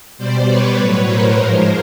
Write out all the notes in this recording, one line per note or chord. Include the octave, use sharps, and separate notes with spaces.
B2 G3 C5 D5
B4 C#5
A2 F#3
A#4 C5
G#2 F3 G#3